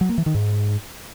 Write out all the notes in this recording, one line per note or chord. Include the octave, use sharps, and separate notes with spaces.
F#3
A#3
E3
D#3
G#2